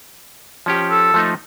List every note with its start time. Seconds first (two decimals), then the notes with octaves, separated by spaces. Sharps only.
0.66 F3 C#4 G4
0.91 A4
1.14 F3 A3 D#4